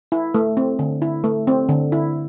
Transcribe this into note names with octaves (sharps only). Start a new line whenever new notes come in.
E4
A3
C4
D3
E4
A3
C4
D3
E4